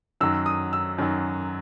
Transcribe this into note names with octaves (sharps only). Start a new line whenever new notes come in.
F#2 D#3 F#3 E6
D#6
E6
F#2 D#3 F#3